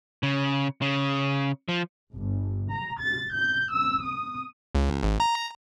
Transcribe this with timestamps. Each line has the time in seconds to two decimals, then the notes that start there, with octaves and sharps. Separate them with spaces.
0.23 C#3
0.82 C#3
1.68 F3
2.12 G1
2.70 A#5
3.00 A6
3.33 G6
3.71 E6
4.01 D#6
4.75 C#2
5.03 G#1
5.20 A#5